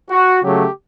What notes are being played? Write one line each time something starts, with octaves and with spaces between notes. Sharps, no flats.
F#4
C#3 F#3 A3 G4